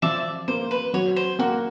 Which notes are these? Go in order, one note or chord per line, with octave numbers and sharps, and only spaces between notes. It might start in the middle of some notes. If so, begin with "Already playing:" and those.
F3 D5 E5
A#3 C5
B4
F#3 C#5
C5
A#3 F#4